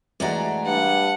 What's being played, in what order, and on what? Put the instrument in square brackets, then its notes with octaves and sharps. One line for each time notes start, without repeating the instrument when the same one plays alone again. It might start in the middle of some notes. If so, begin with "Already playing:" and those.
[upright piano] E3 G#3 F#4 [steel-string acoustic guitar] A3 D5 A#5
[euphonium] G2 [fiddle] F#5